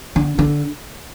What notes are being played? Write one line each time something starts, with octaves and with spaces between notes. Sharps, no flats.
D3
D3